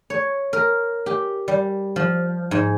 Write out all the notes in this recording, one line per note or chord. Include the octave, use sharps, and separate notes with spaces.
C#5
A#4
G4
G3
F3
G#2